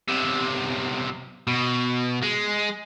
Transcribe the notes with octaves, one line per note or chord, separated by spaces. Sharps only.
B1 C3
B2
G#3